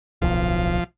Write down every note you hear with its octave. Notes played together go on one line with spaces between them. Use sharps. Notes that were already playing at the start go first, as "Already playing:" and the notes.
D1 B1 F3